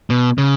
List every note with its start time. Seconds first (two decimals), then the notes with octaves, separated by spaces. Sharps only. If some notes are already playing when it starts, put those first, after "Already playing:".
0.10 B2
0.38 C#3